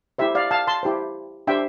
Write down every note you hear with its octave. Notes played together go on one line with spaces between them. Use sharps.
E4 G4 C5 E5
D5 F5
F5 A5
A5 C6
E4 G4 C5
D4 G4 C5 E5 G5